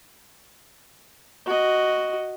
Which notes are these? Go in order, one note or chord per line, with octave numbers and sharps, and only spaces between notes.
F#4 D#5